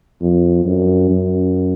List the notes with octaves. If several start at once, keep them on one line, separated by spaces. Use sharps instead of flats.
F2
F#2
F#2